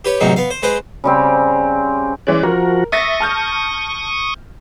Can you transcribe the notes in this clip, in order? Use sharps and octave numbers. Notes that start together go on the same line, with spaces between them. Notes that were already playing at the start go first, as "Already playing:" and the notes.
G4 B4 C#5
A1 E2 C3 F#3 D#4
B3 F5
C5
G#3 B4 C5 F#5
C#3 G3 C4
E3 G#3 C#4 D5
F3 F#4 A#4
E5 C#6 D#6 A6 A#6
A5 F6 G6